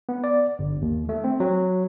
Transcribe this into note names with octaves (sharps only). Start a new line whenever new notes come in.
B3
D5
G1
D#2
A3
C4
F#3